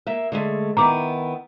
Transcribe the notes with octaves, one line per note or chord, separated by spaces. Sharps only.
A#3 E5
D3 G#3 A3
D#3 B3 E4 A#5 D6